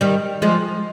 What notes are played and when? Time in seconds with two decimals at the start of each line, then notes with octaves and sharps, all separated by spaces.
0.01 D#3 G3
0.42 F3 G#3